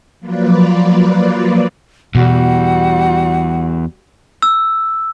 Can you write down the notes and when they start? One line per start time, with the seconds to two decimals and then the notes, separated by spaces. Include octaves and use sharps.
0.19 F3 F#3 A#3 F4 B4 D5
2.15 E2 B2 G3 F#4 F#5
4.42 E6